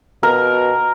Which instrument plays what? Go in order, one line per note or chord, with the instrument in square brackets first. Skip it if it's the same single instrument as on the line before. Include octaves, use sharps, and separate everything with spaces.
[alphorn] B2 [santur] A#4